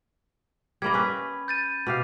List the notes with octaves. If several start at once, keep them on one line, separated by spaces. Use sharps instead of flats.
G3 A#3 D#5 B5 G#6
C#4 B4
G6 A6 D#7
B2 G4 F5